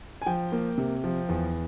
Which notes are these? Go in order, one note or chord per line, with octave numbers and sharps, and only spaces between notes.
G#5
F3 G5
A#3
C3
F3
E2